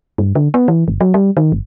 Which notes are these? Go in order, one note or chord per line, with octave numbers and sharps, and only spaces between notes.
G2
D3
B3
E3
G1
F#3
G3
D#3
G1